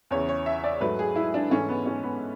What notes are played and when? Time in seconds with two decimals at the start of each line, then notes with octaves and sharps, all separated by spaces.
0.11 E2 C#3 E3 C#5
0.29 C#5
0.46 E5
0.64 D5
0.80 G#2 F#3 A3 B4
0.99 G#4
1.16 E4
1.34 D4
1.50 G#2 E3 A3 C#4
1.69 B3
1.86 C#4
2.03 B3